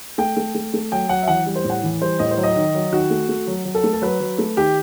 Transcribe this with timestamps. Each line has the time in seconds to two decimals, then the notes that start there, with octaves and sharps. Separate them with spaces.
0.18 A3 G5
0.37 A3
0.55 A3
0.74 A3
0.92 F#3 G5
1.09 F#3 F#5
1.23 E5
1.28 E3 F#5
1.46 G3
1.56 C5
1.64 A2
1.70 F#5
1.83 E3
2.01 G3 C5
2.19 A2 D#5
2.31 C5
2.37 F#3
2.43 D#5
2.56 D#3
2.75 F#3
2.93 D#3 F#4
3.10 A3
3.29 A3
3.47 F#3
3.65 F#3
3.74 A4
3.84 A3
3.93 A4
4.02 F#3 B4
4.20 F#3
4.38 A3
4.57 D#3 G4